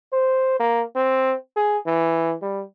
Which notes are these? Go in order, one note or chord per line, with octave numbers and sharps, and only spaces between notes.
C5
A#3
C4
G#4
E3
G3